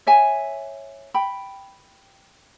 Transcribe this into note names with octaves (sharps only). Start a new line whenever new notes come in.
C#5 E5 G#5
G5 B5